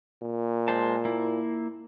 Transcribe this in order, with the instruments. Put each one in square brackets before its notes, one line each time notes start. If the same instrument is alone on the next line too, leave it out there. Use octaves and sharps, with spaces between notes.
[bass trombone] A#2
[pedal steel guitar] G#3 C5 A5
A#3 E4